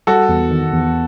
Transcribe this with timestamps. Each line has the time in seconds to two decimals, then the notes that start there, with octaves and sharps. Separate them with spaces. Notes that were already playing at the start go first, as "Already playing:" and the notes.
0.07 G3 F#4 A4
0.29 E2
0.51 D#3
0.73 E2